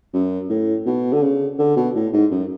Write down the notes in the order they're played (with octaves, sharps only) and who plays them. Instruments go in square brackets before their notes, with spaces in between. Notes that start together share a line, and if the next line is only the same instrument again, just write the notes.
[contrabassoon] F#2
A2
B2
D3
C#3
D3
B2
A2
G#2
F#2